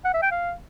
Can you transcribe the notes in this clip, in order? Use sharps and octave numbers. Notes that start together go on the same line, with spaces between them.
F#5
E5
G5
F5